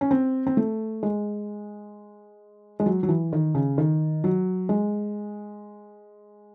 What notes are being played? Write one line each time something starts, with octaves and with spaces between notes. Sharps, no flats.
C#4
C4
C4
A3
G#3
G#3
F#3
F#3
E3
D#3
C#3
D#3
F#3
G#3